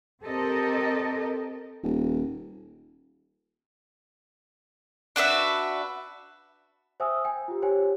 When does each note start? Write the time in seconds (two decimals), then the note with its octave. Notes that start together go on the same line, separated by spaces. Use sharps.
0.24 C4 G4 A4 A#4 D#5
1.83 D#1
5.16 D4 F#4 B4 E5
7.00 C5 E5 G5 G#5 D#6 E6
7.25 G5 G#5
7.48 F4 G4
7.62 G4 C5 C#5 G5 G#5